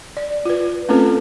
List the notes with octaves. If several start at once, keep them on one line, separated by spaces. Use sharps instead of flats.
D5
F4 B4
A3 C4 C#4 F4 A4 B4